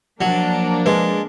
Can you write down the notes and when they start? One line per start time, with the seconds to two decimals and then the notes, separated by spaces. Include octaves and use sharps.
0.21 F3 F#3 A#3 D4
0.86 G#3 G#4 B4